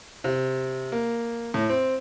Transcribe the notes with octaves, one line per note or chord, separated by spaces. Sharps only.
C3
A#3
A2
C4